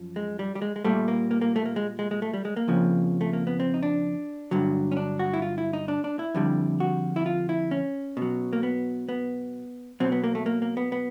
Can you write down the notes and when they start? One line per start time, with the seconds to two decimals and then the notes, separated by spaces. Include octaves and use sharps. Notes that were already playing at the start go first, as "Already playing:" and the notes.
Already playing: F#2 F3
0.16 G#3
0.39 G3
0.55 G3
0.62 G#3
0.76 G#3
0.85 A#2 G3 A3
1.08 A#3
1.31 A#3
1.41 A#3
1.56 A3
1.66 A#3
1.76 G#3
1.99 G#3
2.11 G#3
2.22 A3
2.34 G3
2.45 G#3
2.56 A#3
2.68 F2 C#3 F3
3.21 A3
3.33 A#3
3.47 B3
3.60 C4
3.74 D#4
3.83 D4
4.51 G2 D3 F#3
4.91 C#4
4.97 D4
5.19 F#4
5.33 E4
5.42 F4
5.58 E4
5.73 D#4
5.88 D4
6.04 D4
6.19 E4
6.35 F2 D3 G3
6.80 F#4
7.16 E4
7.26 F4
7.49 E4
7.71 C#4
8.17 B2 F#3
8.53 A#3
8.63 B3
9.09 B3
10.00 B2 F#3 C4
10.12 B3
10.24 A#3
10.35 A3
10.46 A#3
10.62 A#3
10.77 B3
10.92 B3